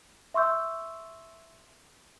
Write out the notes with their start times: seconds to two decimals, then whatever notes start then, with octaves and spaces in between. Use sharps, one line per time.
0.34 E5 C6 C#6 E6 G6